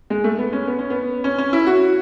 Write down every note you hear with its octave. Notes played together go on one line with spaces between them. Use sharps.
G#3
A3
B3
C#4
B3
C#4
B3
C#4
C#4
E4
F#4